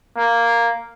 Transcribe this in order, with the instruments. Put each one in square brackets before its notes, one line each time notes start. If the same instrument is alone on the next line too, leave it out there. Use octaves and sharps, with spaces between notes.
[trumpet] A#3